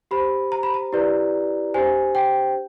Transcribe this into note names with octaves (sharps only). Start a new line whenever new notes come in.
G4 C5 B5
A#5
B5
A#5
E4 G4 B4 D5
D4 G4 C5 G#5
G5